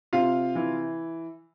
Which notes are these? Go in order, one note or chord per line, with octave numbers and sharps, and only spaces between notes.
C3 F4 F5
E3